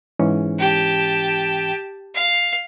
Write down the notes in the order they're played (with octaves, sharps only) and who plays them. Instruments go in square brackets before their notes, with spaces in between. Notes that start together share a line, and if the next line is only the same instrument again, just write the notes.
[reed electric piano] G#2 E3 C#4
[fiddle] G4 A5
F5